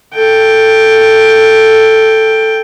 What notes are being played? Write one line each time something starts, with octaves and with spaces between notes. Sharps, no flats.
A4 G5